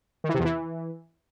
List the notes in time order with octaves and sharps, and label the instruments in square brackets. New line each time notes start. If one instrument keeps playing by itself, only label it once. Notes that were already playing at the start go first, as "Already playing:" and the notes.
[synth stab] D#3
E3
C3
E2
E3